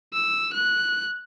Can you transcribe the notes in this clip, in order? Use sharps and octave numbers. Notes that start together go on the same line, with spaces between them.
E6
F#6